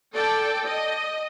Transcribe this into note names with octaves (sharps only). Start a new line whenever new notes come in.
A4 D5 G5 A5
D#5